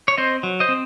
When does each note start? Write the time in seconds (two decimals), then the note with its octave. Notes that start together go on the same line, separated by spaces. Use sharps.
0.08 C#5
0.18 C4 C5 D#5
0.43 F#3
0.60 C5 D#5
0.69 C4